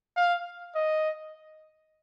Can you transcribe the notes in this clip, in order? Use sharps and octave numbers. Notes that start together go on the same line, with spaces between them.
F5
D#5